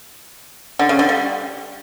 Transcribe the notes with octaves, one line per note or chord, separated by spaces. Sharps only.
D3
C#3
D3
G3